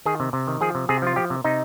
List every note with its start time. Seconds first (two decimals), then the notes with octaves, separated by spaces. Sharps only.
0.06 D#3 G#4
0.20 C3
0.33 C3
0.48 D#3
0.61 F3 G#4
0.75 C3
0.89 C3 G#4
1.02 F3 F4
1.16 F3 G4
1.30 C3
1.44 C3 D#4